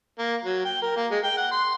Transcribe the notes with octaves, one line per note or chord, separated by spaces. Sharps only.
A#3
F#3
G5
A#4
A#3
G#3
G5
F#5
C6